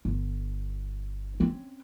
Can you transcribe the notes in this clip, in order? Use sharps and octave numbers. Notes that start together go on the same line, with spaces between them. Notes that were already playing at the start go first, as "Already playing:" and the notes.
G1
C4 C#4